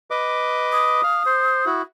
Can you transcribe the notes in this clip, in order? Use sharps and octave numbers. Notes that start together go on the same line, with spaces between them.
B4 D#5 D6
D#6
F5
C5
E4 F#4